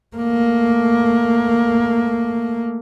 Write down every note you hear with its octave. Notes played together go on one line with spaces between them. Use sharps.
A3 A#3